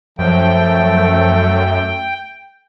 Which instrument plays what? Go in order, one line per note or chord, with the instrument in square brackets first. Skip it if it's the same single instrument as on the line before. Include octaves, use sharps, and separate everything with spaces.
[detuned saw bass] F#2 [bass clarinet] F3 [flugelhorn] A3 [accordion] G5